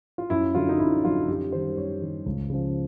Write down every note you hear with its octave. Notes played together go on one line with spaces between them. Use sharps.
F4
F#2 E4
D3 F#3 F4
D#4
F#2 E4
D3 F#3 F4
F#2 G4
D#3 G3 C5
F#2 C#5
D#3 G3
C#2
C#3 F3